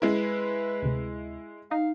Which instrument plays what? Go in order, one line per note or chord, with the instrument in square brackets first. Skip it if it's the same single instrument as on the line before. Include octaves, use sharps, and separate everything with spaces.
[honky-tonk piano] G#3 E4 [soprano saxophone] B4
[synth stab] D2 C3
[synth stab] D#4 [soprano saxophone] F5